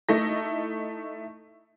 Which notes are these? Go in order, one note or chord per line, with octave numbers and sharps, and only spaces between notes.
A3 D#4 E4 A#6